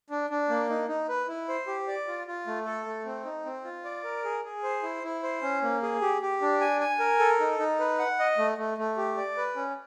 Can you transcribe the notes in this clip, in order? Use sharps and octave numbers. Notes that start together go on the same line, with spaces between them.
D4
D4
A#3
D#4
D#4
B4
E4
C5
G4
D5
F4
F4
A3
A4
A3
C4
D#4
C4
F4
D5
A#4
G#4
G#4
C5
E4
E4
C5
C#4
A#3
G#4
G4
G4
D4
G#5
G#5
A#4
A4
D#4
D#4
B4
F#5
D#5
A3
A3
A3
G4
D5
B4
C#4